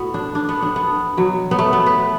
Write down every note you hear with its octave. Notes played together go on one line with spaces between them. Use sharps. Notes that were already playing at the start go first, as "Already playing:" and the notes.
Already playing: A2 B3 F#4
D4
D4
B3
D4
B3
B2 F#3
B3
A3
B3
B4